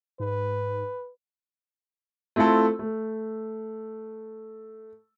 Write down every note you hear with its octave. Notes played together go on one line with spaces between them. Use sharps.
G#2 B4
A3 C4 E4 F4 A4
A3